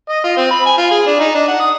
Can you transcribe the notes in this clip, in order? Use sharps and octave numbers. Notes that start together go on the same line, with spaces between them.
D#5
F4
C4
B5
G#5
F4
G#4
D4
D#4
D4
F#5
D#6